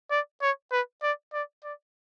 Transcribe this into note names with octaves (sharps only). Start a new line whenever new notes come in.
D5
C#5
B4
D5
D5
D5